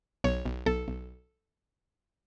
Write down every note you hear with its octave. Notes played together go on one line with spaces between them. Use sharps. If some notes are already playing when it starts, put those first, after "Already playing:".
B1 C#5
B1
B1 A4
B1